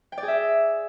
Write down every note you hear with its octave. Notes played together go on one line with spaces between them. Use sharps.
G5
D5
G#4
E5